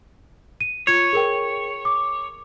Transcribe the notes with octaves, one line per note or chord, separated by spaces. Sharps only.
D#7
F4 C#5 G#6
G#4 A#4 G5
D6